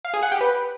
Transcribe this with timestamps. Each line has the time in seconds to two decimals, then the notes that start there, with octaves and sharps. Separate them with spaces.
0.05 F5
0.14 G#4
0.23 F#5
0.32 G4
0.41 B4